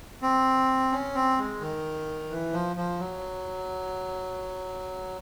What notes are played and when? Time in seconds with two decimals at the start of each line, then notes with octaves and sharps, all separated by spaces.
0.22 C4
0.92 C#4
1.15 C4
1.38 G#3
1.61 D#3
2.31 E3
2.53 F3
2.76 F3
2.99 F#3